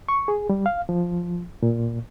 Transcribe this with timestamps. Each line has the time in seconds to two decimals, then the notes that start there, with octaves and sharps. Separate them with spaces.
0.09 C#6
0.28 G#4
0.49 G3
0.66 F5
0.89 F3
1.63 A#2